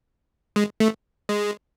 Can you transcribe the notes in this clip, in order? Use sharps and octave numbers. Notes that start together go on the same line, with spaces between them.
G#3
A3
G#3